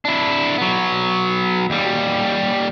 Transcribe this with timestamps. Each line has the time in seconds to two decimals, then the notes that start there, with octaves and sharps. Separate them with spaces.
0.05 D4 E4
0.58 F#3 B3
1.70 D#2 G3